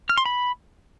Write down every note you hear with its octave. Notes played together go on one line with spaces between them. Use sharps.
F6
C6
B5